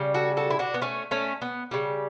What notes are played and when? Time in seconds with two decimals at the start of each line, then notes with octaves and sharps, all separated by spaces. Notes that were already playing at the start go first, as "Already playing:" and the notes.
Already playing: C#3 G3
0.14 F#4 A4
0.37 F#4 A4
0.50 E4
0.59 D4 F#4
0.74 B3
0.81 A3 C#4
1.11 A3 C#4
1.42 B3
1.71 C#3 G3